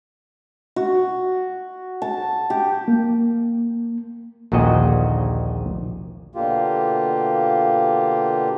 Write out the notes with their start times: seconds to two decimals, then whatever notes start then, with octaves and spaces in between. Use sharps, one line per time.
0.76 F#4
2.02 A5
2.50 G4
2.88 A#3
4.52 A#1 D#2 A#2 D3 F#4 D#5
6.35 B2 D3 A#3 F4 G4